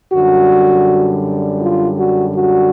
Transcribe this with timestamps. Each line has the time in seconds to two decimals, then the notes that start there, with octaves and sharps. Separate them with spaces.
0.13 F#2 D3 G3 F#4
1.62 F4
1.99 F#4
2.36 F#4